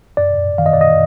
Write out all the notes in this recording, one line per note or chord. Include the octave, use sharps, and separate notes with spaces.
F#2 D5
D#3 F5
D#5
D5
D#5